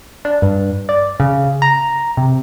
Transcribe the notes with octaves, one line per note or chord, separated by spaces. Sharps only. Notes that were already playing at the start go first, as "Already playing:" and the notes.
D4
G2
D5
C#3
A#5
C3